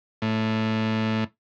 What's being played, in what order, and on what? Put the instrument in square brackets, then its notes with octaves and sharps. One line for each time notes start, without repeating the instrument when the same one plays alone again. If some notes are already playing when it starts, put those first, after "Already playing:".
[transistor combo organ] A2